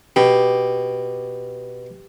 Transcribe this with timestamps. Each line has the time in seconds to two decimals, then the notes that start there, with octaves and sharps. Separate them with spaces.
0.16 B2 G4